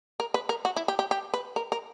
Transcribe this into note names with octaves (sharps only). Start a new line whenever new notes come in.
A#4
B4
A#4
F#4
E4
G4
G4
G4
B4
A#4
A#4